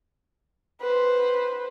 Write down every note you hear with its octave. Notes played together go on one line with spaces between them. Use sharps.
B4 C5